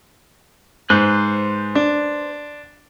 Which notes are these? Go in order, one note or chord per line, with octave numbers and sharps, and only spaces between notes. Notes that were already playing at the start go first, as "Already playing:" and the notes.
G#2 B4 C5 F#6
D4